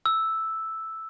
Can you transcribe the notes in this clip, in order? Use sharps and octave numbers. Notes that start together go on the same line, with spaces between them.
E6